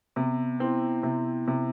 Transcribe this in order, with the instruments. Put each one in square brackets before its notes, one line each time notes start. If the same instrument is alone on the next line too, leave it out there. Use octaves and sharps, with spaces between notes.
[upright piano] C3 [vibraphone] B3
[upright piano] C4 [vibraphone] E4
[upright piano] C3
C3